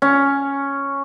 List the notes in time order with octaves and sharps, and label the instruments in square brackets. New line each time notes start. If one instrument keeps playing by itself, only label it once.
[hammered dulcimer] C#4